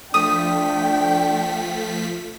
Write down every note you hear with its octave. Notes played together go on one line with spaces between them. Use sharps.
F3 A3 D4 G5 D#6 B6